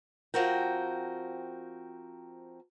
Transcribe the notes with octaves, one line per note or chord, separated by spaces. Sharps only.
F3 C4 F#4 A#4 G5